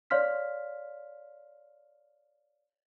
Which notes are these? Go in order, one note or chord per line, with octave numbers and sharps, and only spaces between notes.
C#5 D5 F5 C6 F6 B6